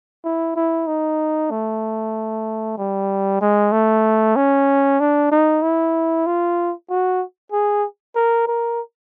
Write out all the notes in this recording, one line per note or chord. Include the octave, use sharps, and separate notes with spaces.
E4
E4
D#4
A3
G3
G#3
A3
C#4
D4
D#4
E4
F4
F#4
G#4
A#4
A#4